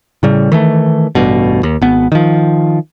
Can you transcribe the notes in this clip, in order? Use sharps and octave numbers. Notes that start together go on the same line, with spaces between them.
A2 C#3 G3
D#3 E3 A3
A1 G2 B2
D#2
G#1 B3
D#3 F3